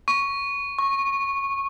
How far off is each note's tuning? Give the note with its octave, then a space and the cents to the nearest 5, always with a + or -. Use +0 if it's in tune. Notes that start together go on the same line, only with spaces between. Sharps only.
C#6 +5
C#6 -15